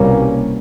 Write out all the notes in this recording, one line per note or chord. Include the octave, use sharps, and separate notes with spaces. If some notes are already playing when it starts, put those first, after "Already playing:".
Already playing: C2 B2 G3 A#3 C#4